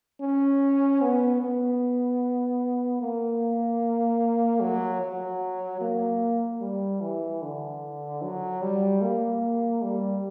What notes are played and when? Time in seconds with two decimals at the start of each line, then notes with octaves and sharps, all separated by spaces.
0.21 C#4
1.01 B3
1.41 B3
3.01 A#3
4.61 F#3
5.01 F#3
5.81 A#3
6.61 G3
7.01 E3
7.42 D3
8.22 F#3
8.62 G3
9.02 A#3
9.82 G3